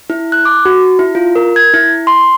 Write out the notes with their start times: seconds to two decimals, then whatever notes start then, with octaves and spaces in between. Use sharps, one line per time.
0.10 E4
0.32 F#6
0.45 D6
0.65 F#4
0.99 E4
1.15 F4
1.36 A#4
1.56 G#6
1.74 E4
2.07 C6